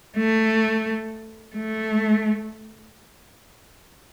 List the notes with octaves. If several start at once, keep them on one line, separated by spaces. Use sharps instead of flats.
A3
A3